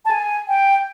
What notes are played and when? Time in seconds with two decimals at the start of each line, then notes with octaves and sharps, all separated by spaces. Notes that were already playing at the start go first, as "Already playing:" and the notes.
0.05 A5
0.11 G#5
0.48 G5